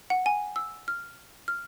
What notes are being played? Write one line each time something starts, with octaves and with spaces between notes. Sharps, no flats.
F#5
G#5
E6
F6
F6